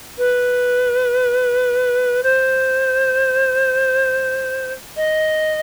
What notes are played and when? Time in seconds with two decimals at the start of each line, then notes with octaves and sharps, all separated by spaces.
0.18 B4
2.23 C5
4.96 D#5